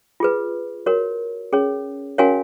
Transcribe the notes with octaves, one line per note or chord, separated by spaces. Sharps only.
F4 G#4 B4
F#4 A#4 C#5
C#4 G#4 C#5
C#4 F#4 A#4 C#5 F5 G#5